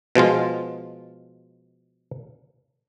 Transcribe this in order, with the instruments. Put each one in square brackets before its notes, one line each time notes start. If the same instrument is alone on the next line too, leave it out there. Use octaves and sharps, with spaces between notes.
[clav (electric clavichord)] B2 F3 G#3 F4